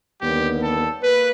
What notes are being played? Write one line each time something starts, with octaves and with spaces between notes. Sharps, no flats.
D#2 D3 G3 B3 G4
A4
A#3 B4